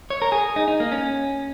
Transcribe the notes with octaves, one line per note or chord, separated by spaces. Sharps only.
C#5
A#4
G#4
D#4
D#4
A#3
C#4